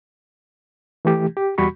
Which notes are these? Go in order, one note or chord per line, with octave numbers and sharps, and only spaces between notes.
E3 A3 G4
G4
E2 G3 F#4 B5 C#6